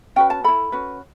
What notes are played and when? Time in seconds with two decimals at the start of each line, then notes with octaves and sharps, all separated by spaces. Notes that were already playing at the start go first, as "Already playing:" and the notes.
0.16 C#4 F#4 B4 G5
0.30 A5
0.44 E4 A4 B5
0.72 C#4 F#4 B4